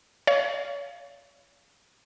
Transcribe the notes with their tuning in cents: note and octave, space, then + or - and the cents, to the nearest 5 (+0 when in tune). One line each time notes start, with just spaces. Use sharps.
C#5 +40 F5 +0